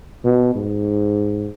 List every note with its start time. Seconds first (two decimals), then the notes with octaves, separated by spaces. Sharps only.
0.24 B2
0.55 G#2